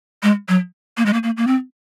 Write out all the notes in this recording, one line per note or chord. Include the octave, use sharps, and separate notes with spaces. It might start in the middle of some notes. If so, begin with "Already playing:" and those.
G#3
F#3
A#3
G#3
A#3
A#3
A#3
C4